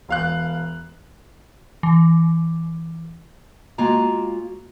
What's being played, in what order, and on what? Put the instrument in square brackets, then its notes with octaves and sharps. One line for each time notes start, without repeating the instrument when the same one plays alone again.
[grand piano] E1 F5 F#6
[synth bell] E3
[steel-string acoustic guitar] G#3 A#3 F4 F#4 A#5